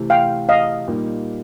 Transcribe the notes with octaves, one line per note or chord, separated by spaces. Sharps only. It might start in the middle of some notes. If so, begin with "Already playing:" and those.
Already playing: C3 E3 A3
F5 G5
D#5 F5
A#2 G3 A#3 D#4 G4